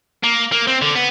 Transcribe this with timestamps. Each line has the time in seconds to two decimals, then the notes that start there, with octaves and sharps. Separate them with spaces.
0.23 A#3
0.52 A#3
0.67 C4
0.82 D3
0.96 B3